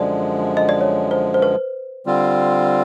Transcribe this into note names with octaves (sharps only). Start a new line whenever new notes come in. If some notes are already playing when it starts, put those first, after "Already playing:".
Already playing: F#2 D3 F3 G#3 D5
D#5
D5
C#5
C5
C5
B4
D3 G3 C4 F4